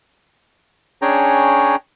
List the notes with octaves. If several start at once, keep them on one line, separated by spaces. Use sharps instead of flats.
C#4 D4 G#4 C#5 G5 A#5